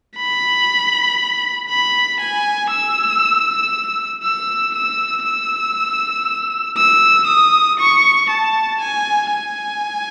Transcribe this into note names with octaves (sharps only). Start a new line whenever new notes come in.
B5
B5
G#5
E6
E6
E6
E6
E6
D#6
C#6
A5
G#5
G#5